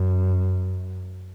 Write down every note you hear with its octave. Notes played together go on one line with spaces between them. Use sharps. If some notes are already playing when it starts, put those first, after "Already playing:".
Already playing: F#2